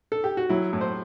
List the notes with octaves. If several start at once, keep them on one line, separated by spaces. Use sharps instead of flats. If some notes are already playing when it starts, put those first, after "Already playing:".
A4
G4
F#4
F#3 E4
A2
C5